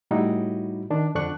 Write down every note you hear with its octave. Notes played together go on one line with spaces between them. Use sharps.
A2 G3 D#4 E4 F#4
D#3 D4
F2 D3 D4 C#6 F#6